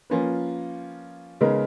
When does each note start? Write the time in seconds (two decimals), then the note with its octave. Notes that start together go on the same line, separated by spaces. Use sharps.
0.10 F3 A#3 C#4 F4 B4
1.41 C#3 G#3 B3 D#4 A#4